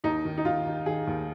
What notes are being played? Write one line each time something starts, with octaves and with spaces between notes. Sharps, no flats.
D#2 D#4
D#3
D#4
D#3 F4
D#3
D#3 G#4
D#2